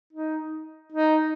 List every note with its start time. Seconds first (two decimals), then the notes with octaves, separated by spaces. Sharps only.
0.13 D#4
0.92 D#4